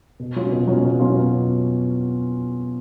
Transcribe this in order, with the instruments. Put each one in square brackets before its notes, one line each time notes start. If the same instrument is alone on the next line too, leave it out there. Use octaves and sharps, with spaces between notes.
[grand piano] B2
F#3 C#4 F4
B2
F#3 C#4 F4
B2
F#3 C#4 F4
B2